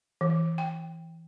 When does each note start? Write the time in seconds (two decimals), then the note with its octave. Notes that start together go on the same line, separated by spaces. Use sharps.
0.21 E3
0.58 G5